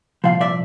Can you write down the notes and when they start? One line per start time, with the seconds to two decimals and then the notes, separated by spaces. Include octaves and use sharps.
0.24 C2 A#2 F3 F5
0.41 D5 E5